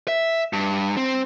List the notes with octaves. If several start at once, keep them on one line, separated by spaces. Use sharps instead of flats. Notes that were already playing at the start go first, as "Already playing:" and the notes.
E5
G2
C4